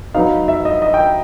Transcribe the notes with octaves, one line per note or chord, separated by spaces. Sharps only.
F#3 B3 D#4 F5
E5
D#5
D#5
G5